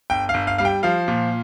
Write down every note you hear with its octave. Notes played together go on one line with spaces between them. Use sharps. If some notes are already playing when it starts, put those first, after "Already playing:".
G1 G5
F5
G1
F5
G3 F5
G5
F3 F5
A#2